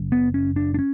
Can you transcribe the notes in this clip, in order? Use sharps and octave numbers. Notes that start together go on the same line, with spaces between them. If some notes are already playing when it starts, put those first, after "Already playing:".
Already playing: F#1 F#2 C#3
B3
C#4
D4
D4
C#4